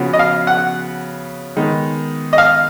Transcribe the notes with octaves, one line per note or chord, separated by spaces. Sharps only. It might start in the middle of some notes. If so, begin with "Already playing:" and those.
Already playing: C#3 F3 B3 F#4
D#5
F5
F#5
D#3 G#3 B3 D#4
D#5
F5